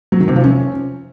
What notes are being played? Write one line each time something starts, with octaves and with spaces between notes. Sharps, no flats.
F#3
D#3
C3
F3
C#4